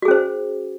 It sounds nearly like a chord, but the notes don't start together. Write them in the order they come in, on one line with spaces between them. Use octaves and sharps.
F#4 G#4 C#4 C5